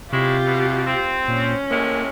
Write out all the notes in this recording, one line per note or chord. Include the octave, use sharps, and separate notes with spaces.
C3 G#3 C#4 E4 F4 G4
B2
C4
A#2 C#4
A2 C3 G#3 A#3